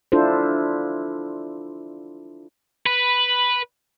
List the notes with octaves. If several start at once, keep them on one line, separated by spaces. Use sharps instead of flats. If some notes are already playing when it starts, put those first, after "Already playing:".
D4 E4 F4 A4 C5
B4